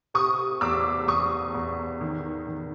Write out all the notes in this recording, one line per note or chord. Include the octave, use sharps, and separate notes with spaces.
C3 C#6 D#6
E2 D6 E6
E2 C#6 D#6
E2
D#3
D#3